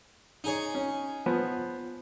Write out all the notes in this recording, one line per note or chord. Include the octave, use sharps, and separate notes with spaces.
D#4 G#4 C#5
C#4
F3 B3